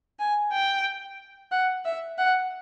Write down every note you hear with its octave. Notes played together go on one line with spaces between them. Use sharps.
G#5
G5
F#5
E5
F#5